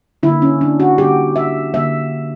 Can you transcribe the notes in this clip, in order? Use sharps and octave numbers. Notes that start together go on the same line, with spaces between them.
D3 A#3 E4
C#4
D4
F#4
D3 A#3 G4
E5
D3 A#3 E5